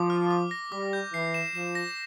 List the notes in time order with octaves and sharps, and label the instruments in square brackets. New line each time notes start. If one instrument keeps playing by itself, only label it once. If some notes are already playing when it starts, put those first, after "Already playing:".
Already playing: [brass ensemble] F3 [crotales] D6
[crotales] F6
D6
A#6
[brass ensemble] G3 [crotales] D6
[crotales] G6
[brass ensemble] E3 [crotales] C7
[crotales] E7
[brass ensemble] F3 [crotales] E7
[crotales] A#6